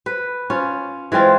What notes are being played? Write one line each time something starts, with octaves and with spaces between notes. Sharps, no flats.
B4
C#4 F4
E3 G#3 C4 F4